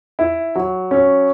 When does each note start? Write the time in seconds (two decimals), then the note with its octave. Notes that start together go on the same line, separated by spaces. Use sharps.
0.19 E4
0.55 F#3
0.91 C#4